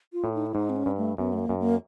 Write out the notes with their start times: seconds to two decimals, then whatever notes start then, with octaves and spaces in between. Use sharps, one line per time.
0.13 F4
0.24 A2
0.34 D#4
0.46 E4
0.55 G#2 D#4
0.70 C4
0.76 C#4
0.86 G2
0.97 A3
1.18 F#2 B3
1.33 A3
1.39 A#3
1.49 F#2
1.60 A#3